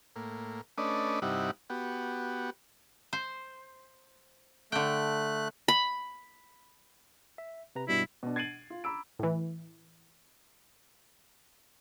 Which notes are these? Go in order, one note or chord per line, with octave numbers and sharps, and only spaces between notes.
A2 A#3
A3 C#4 D4 B4 D5 D#5
G2 C3 G3 D#4 E4 F#5
B3 F#4 G4
C5
D3 A3 G5 F#6
B5
E5
C3 B4 A#5
G2 B2 G3 E4
B2 D4
G#6 A6 C7 D7 D#7 F#7
F4
A#5 B5 D6 E6 D7
A2 E3